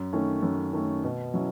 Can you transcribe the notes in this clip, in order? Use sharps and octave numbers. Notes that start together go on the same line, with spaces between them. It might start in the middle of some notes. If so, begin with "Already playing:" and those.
Already playing: F#2
D#3 A3 C#4
F#2
D#3 A3 C#4
B2
F#3 C#4 E4